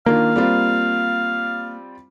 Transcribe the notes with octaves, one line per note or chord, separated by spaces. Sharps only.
D#3 A#3 D4 F4 F5
G3 C4 F4